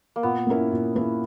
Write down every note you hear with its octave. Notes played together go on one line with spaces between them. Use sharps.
A#3
A#2 B3
A#3 C#4 E4 A#4
A#2
A#3 C#4 E4 A#4